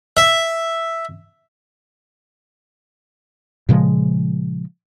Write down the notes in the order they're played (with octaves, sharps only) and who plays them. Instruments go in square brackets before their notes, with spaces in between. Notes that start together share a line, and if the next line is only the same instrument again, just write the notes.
[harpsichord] E5
[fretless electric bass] A#2 C#3 F3 G#3